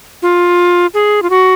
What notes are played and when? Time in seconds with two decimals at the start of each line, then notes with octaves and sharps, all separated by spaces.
0.22 F4
0.94 G#4
1.22 F4
1.30 F#4